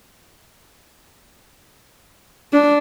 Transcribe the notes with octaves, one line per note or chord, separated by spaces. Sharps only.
D4